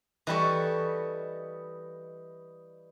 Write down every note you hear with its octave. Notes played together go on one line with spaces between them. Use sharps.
E3 G3 A4 D#5 B5 C#6